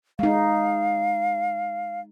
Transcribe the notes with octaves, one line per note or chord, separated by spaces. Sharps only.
G#3 D#4 F5